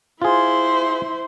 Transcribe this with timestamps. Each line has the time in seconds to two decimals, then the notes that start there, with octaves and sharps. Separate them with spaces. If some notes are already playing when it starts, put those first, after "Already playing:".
0.22 E4 F4 G#4 C5